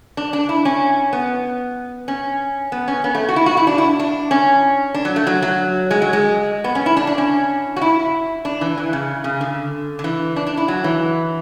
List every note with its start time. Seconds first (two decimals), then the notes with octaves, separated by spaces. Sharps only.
0.17 D4
0.33 D4
0.49 E4
0.65 C#4
1.13 B3
2.08 C#4
2.72 B3
2.88 C#4
3.04 B3
3.15 A3
3.29 F#4
3.36 E4
3.46 F#4
3.57 E4
3.67 D4
3.78 E4
3.99 D4
4.31 C#4
4.94 D4
5.05 F#3
5.16 A3
5.27 F#3
5.43 F#3
5.91 G#3
6.02 F#3
6.13 G#3
6.64 B3
6.75 C#4
6.86 E4
6.97 D4
7.07 D4
7.18 C#4
7.76 F#4
7.81 E4
8.45 D4
8.61 E3
8.77 E3
8.93 C#3
9.24 C#3
9.41 D3
9.99 D3
10.04 E3
10.36 D4
10.46 D4
10.57 E4
10.68 F#3
10.84 E3